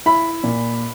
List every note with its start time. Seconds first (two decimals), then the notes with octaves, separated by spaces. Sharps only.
0.06 E4 B5
0.44 A#2